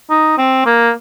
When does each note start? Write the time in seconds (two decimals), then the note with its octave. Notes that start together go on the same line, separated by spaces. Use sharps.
0.10 D#4
0.38 C4
0.66 A#3